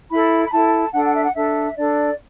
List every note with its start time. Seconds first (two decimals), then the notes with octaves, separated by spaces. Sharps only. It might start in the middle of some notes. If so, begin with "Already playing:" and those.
0.10 E4 A4 B5
0.44 B5
0.51 E4 A4 A5
0.92 D4 A4 F#5
1.04 F#5
1.13 E5
1.23 F#5
1.34 D4 A4 E5
1.76 D4 A4 D5